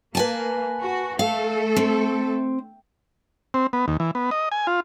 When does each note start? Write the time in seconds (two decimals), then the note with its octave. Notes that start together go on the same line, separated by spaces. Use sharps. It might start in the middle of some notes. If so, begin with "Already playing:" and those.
0.15 A#3 B4 G#5 A5
0.81 F#4
1.19 A3 A4 F5
1.76 C4
3.54 C4
3.73 B3
3.88 D#2
4.00 E3
4.15 B3
4.31 D#5
4.52 G#5
4.67 F4